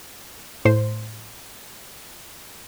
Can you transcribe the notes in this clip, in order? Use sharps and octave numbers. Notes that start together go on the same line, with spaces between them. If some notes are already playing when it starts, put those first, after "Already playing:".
A2 C5 C6